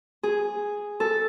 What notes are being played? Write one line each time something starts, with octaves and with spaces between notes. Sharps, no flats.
G#4
A4